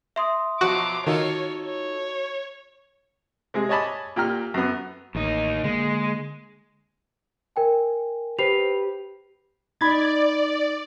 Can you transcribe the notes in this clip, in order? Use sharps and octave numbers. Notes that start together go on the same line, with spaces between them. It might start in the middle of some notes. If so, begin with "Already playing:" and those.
E5 C6 D#6
B2 F3 F#3 F#4 D6
D#3 D#4 F4 F#4 A4 C#5
C#5
C3 G#3 G#4
C#5 D#5 G#5 A5 B5 D6
A#2 G4 G5 A#5 F6
F#2 B3
A1 D#2 D#4
D3 G#3 A#3
A#4 G5 G#5
G4 B4 C5 C7 F7
D#4 D5 B5 G#6 A6